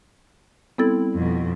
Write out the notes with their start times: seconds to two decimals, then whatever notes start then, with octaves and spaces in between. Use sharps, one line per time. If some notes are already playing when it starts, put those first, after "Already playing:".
0.78 G3 B3 C4 E4 A4 A6
1.14 F2 B2